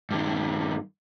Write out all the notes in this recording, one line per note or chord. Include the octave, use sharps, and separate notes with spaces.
G2 D#3